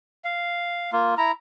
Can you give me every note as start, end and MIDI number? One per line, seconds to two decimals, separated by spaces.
0.24 0.91 77
0.93 1.15 58
0.93 1.15 65
1.18 1.32 64
1.18 1.32 82